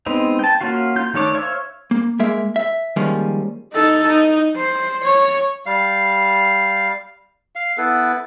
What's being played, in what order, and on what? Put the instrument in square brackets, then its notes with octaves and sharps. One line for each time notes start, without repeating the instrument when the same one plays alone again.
[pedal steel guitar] G#3 B3 C4 D#4
G5 A5
A#3 C#4 F4 F#4 F5
F4 G6
D#3 A3 D4 C#5 D6
C5 C#5 E5 F5 C#6
[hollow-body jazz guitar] A#3
G#3 A#3 E5
E5
D#3 F3 G3 G#3 A#3 C#4
[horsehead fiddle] D#4 A4
D#4
C5
C#5
[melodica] G3 F5
F5
B3 E4 A4 B4